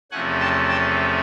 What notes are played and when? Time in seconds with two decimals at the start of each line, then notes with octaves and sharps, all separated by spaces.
0.11 E2 C3 F3 A3 C#4 F#5 G#5
0.40 G5 A5
0.68 G5 A5